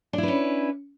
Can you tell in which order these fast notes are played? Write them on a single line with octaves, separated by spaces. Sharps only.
D4 E4 B4 C#4